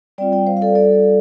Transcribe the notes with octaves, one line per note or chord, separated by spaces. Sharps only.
G3 C4 F4 D5 G5
D5 G5
C5 F5
F5
A4 D5
A4 D5